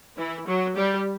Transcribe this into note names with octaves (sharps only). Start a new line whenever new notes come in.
E3 E4
F#3 F#4
G3 G4